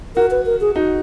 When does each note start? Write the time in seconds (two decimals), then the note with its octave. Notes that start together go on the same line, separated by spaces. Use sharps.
0.16 F#4 A#4
0.31 B4
0.46 A#4
0.61 G#4
0.76 D#4 F#4